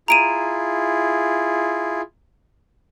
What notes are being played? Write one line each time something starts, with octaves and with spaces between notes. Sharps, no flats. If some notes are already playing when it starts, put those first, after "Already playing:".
E4 F4 G#4 A#5 D7 D#7